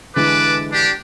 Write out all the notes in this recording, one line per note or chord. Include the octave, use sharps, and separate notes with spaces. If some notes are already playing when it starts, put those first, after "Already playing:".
D3 E3 G#3 B4 A5 D6
D4 G4